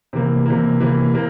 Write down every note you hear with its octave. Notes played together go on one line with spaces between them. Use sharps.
C3 E3 A#3
C3 E3 A#3
C3 E3 A#3
C3 A#3